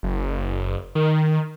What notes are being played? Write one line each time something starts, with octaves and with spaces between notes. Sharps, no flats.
F#1
D#3